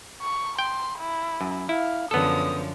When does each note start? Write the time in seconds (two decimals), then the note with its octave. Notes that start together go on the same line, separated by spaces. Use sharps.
0.22 C#6
0.59 G5 C6
0.99 E4
1.41 F#2
1.69 E4 F5
2.11 F#2 D3 F3 B3 A4 D#6